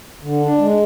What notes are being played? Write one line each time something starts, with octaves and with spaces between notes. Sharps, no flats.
D3
D4
G#3